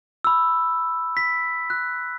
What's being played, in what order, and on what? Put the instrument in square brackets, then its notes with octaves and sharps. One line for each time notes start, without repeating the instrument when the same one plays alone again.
[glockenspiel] B5 E6
B6
F#6